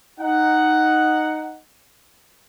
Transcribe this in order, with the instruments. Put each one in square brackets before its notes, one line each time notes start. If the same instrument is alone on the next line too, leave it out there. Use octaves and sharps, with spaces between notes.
[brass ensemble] D#4 F#5